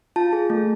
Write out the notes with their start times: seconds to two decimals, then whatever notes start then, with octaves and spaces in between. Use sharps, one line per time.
0.16 F4 A5
0.33 G#4
0.50 A3